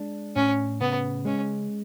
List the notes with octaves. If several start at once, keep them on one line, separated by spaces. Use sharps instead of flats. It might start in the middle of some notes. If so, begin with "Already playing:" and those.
Already playing: G#3 D4
A2 C#4
C#3 B3
G#3 C#4